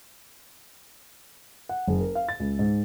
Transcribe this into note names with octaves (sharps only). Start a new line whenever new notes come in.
F#5
F#1
A#4
F5
A6
C#2
G#2